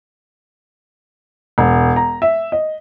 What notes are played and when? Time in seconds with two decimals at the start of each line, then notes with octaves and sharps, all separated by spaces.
1.58 E1
1.96 A#5
2.22 E5
2.52 D#5